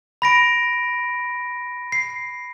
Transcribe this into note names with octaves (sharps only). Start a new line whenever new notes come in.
B5 A#6 D7
C7